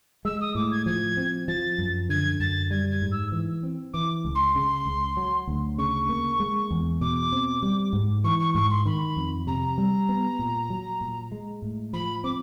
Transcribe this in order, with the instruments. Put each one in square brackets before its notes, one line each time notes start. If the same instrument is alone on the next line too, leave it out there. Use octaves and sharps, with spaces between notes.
[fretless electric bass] G#3 [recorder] E6
[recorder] D#6
[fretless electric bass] A2 [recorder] D6
[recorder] G#6
[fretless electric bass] F3 [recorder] G#6
[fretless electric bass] C4
[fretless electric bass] F3 [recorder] A6
[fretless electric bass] F#2
[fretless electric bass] D3 [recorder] G#6
[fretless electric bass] F#2 [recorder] A6
[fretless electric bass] G3 [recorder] G#6
[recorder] G#6
[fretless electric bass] G#2
[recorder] E6
[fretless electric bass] E3
C4
[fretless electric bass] E3 [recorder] D6
[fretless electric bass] C#2
[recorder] C6
[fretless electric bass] C#3
C#2
F#3
D2
[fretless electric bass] C#3 [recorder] C#6
[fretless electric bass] A#3
G#3
E2
[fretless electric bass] B2 [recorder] D6
[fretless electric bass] C4
G3
G#2
[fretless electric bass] E3 [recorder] C#6
[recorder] C#6
[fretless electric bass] G#2 [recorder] C#6
[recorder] C6
[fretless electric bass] D#3 [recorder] B5
[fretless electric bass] F2
[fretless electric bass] C3 [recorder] A#5
[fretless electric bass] G3
B3
A#2
F#3
A#2
G#3
A2
[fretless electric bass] F3 [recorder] B5
[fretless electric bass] C4 [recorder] D6